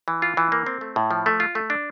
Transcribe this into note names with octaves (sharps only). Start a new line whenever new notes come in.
E3
F4
E3
A#3
C4
A3
A2
F3
A3
F4
A3
D4